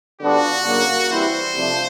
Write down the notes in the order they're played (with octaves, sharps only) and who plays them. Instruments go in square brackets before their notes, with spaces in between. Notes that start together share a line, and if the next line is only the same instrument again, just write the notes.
[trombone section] D3 G3 B3 D4 F4 [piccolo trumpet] F#4
[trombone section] C#3 F#3 A#3
[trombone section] E3 G3 C4 E4 [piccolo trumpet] C5
[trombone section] C3 F3 A3 D4